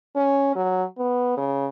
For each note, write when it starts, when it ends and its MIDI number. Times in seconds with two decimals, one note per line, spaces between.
0.16 0.52 61
0.55 0.83 54
0.98 1.37 59
1.37 1.67 49